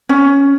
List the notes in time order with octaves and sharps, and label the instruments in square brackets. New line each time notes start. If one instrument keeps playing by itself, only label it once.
[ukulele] C#4